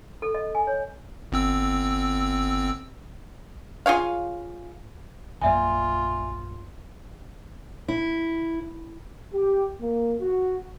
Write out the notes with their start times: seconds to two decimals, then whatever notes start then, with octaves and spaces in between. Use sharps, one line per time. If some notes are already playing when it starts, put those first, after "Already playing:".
0.22 A4
0.35 D#5
0.55 G#5
0.67 C#5
1.32 G1 C4 E6
3.86 F4 G#4 C#5 F5
5.42 A#1 F#2 A#3 F4 D5 E5 G#5
7.88 E4
9.33 G4
9.81 A#3
10.21 F#4